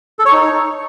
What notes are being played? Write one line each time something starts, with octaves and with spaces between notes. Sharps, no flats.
A4
C#5
D#4